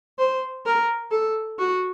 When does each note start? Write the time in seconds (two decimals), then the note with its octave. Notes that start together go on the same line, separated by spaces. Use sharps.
0.19 C5
0.65 A#4
1.12 A4
1.59 F#4